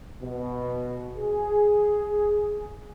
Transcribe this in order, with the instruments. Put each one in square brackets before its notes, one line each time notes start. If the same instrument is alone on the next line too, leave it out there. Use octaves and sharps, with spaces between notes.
[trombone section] B2
G#4